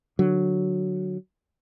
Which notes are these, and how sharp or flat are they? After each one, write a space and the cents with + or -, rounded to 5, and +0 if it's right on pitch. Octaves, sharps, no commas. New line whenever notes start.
D3 +15 F#3 +0